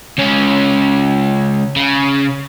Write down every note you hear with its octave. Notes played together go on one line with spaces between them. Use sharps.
C#2 C#4
C#3